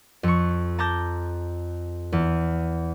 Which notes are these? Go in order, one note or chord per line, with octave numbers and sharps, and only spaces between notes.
F2 C#6
A5 A#5 D6 G6 A#6
E2